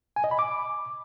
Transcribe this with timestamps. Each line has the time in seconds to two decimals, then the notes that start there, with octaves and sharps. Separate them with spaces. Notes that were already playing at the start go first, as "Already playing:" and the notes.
0.16 G#5
0.24 D#5
0.31 B5
0.39 D6